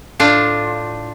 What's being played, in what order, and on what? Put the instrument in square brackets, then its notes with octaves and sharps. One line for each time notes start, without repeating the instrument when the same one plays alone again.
[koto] A2 D4 F4